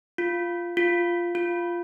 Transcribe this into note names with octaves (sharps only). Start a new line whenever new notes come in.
F4
F4
F4